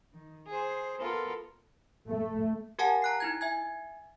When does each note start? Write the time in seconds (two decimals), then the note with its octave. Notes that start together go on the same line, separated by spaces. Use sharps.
0.13 D#3
0.47 G#4 C5
0.99 B3 F4 A4 A#4
2.08 A3
2.79 G4 A#4 F5 F#5 G#5 A5
3.02 A#5 F#6 C7
3.20 D#4 E4 G#6
3.41 E5 G#5 G#6